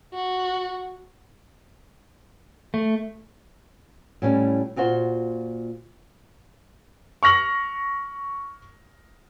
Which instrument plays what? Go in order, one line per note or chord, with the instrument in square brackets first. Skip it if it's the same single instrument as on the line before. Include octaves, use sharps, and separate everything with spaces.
[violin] F#4
[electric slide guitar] A3
[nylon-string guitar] A2 G3 C#4
A#2 F4 F#4 C5
[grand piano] C#6 F6 A#6 F#7